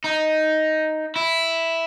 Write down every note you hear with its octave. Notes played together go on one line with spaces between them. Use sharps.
D#4
E4